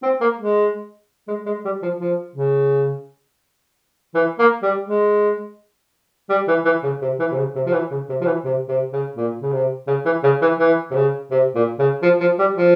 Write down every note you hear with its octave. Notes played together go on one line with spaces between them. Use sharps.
C4
A#3
G#3
G#3
G#3
G3
F3
F3
C#3
E3
A#3
G3
G#3
G3
E3
E3
C#3
C3
E3
C3
C#3
C3
F3
E3
C#3
C3
F3
E3
C3
C3
C#3
A#2
C#3
C3
C#3
E3
C#3
E3
E3
C3
C#3
C3
A#2
C#3
F3
F3
G3
F3